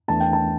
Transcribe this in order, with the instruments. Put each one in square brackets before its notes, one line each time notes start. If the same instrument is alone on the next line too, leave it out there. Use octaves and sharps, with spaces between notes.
[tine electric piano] E2 E3 A3 D4 [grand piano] A5
[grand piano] G5
A5